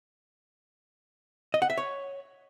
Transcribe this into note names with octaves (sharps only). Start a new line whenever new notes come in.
D#5
F#5
E5
C#5